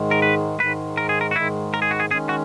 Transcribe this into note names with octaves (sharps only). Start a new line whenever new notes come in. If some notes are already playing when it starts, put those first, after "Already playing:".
Already playing: G#2 D#3 G#3
A#4
B4
G#2 D#3 G#3 B4
A#4
G#4
A#4
F#4
G#2 D#3 G#3 E4
A#4
G#4
F#4
G#4
D#3 G#3 C#4 G#4
F#4